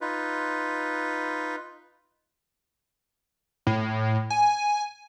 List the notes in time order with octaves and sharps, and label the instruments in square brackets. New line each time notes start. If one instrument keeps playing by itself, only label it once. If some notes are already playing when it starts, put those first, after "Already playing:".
[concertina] D#4 F4 B4
[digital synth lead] A2
G#5